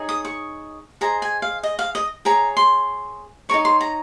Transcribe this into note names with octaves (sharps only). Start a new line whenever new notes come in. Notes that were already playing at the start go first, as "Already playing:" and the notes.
Already playing: D#4 G#4 C#5
D#6
C#6
G#4 C5 D#5 A#5
G#5
F5
D#5
F5
D#5
G#4 C#5 A#5
C6
D#4 A#4 C#5 C#6
C6
A#5